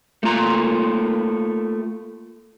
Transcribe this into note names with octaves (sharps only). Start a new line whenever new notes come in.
A3 A#3 F4 A#5